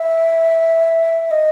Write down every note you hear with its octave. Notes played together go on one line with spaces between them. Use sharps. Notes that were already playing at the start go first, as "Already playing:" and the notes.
Already playing: E5
D#5